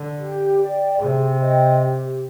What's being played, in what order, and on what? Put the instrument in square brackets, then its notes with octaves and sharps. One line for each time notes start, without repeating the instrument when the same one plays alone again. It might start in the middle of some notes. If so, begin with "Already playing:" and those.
Already playing: [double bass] D3
[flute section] G4
D5 G5
[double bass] C3 [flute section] G#4
[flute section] C5 D#5 G5
G4